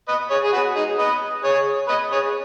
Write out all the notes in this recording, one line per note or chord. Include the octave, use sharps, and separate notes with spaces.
B4 D#5
G#4 C#5
G#4
F#4 B4
D#4 G#4
B4 D#5
G#4 C#5
B4 D#5
G#4 C#5